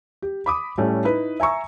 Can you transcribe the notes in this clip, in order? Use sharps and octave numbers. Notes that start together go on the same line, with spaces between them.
G4
B5 D6 D#6
A2 G3 A3 C#4
D#4 E4 B4
E5 G#5 A#5 C#6 E6